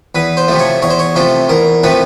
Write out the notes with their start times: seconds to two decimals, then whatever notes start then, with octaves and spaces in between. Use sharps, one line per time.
0.15 E2 B4
0.37 C5
0.48 C3 F3 A3
0.59 C#5
0.82 E2 C#5
0.90 C5
0.99 C#5
1.16 C3 F3 A3 C5
1.49 E2 A#4
1.83 C3 F3 A3 B4